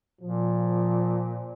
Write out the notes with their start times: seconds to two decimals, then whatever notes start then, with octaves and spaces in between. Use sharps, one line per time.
0.21 A#2 F3